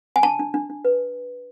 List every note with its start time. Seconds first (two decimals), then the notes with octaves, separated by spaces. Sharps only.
0.16 G#5
0.23 D4 A5
0.39 D4
0.54 D4
0.70 D4
0.85 B4